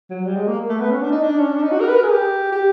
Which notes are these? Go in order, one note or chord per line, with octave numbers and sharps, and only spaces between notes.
F#3
G3
G#3
A#3
A3
B3
C#4
D4
D#4
D4
C#4
D4
D#4
F#4
A#4
B4
A#4
G#4
G4
G4